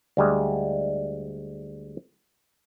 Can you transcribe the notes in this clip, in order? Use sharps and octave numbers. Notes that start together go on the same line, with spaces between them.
D2 G3 G#3